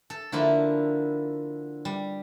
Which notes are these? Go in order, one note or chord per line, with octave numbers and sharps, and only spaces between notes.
A4
D3 F3 A#3 E4
G3